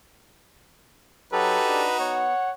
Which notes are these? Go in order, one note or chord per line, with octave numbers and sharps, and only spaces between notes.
F#3 D#4 F#4 G4 A4 B4
D4
B3 C#5 F#5